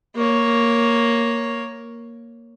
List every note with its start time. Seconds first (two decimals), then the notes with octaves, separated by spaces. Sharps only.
0.16 A#3 C#5